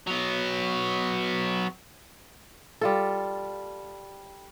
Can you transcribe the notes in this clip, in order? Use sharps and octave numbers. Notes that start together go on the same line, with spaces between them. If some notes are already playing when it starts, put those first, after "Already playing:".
F#3 B3
G3 F4 A4